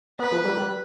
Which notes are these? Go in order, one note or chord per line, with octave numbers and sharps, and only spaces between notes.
B3 B4
F3
G3
G3